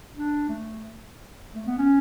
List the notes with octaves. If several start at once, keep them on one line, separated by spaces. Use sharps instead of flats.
D4
A3
A3
B3
C#4